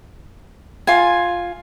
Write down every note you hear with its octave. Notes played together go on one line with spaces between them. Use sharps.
F4 G#5